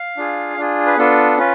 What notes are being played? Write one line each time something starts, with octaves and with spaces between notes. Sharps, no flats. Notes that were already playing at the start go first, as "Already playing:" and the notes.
Already playing: F5
D4 F4 G#4
D4 F4 G#4
B4
B3 D4 F4 A4
C#4 F4 B4